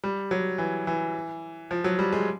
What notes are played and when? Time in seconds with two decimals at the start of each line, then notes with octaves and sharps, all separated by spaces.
0.04 G3
0.31 F#3
0.58 E3
0.87 E3
1.71 F3
1.84 F#3
1.99 G3
2.13 G#3